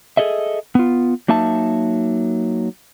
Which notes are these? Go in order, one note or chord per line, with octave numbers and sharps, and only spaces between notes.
G#4 A4 D#5 E5
B3 F4
F#3 A#3 D#4 E5 A5